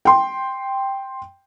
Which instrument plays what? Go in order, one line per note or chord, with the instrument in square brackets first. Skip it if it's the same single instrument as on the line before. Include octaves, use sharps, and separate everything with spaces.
[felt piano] G5 C6